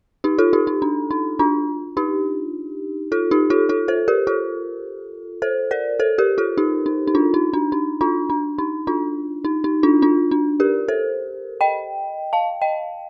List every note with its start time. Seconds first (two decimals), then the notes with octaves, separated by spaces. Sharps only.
0.24 D#4 G4
0.38 F4 A4
0.53 D#4 G4
0.67 D#4
0.82 D4
1.11 D#4
1.39 D4 F4
1.97 D#4 G4
3.12 F4 A4
3.31 D#4 G4
3.50 F4 A4
3.69 F4 A4
3.88 A4 C5
4.08 G4 A#4
4.27 F4 A4
5.42 A4 C5
5.71 A#4 D5
6.00 A4 C5
6.18 G4 A#4
6.38 F4 A4
6.58 D#4 G4
6.86 D#4
7.07 D#4
7.15 D4 F4
7.34 D#4
7.53 D4
7.72 D#4
8.01 D4 F4
8.30 D4
8.58 D#4
8.87 D4 F4
9.45 D#4
9.64 D#4
9.83 D4 F4
10.02 D4 F4
10.31 D4
10.60 G4 A#4
10.88 A4 C5
11.61 D#5 G5
12.33 F5 A5
12.62 D#5 G5